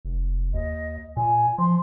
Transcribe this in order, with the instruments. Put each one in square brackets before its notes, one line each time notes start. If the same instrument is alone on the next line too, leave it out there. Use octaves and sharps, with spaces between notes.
[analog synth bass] F1
[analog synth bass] D#2 [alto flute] D#5
[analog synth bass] A#2 [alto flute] G#5
[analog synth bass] F3 [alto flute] C6